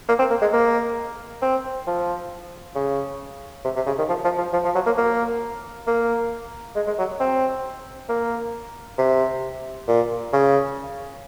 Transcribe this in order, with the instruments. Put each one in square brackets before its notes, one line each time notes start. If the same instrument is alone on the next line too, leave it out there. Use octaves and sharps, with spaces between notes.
[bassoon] A#3
C4
A#3
G#3
A#3
C4
F3
C#3
C3
C3
C#3
D#3
F3
F3
F3
F3
F3
F#3
A#3
A#3
A#3
G#3
G#3
F#3
C4
A#3
C3
A#2
C#3